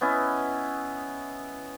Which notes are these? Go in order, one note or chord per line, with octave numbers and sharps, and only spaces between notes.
B3 C#4 E4 D#5